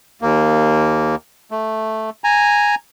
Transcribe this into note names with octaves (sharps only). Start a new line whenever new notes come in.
D#2 A#3
A3
G#5 A#5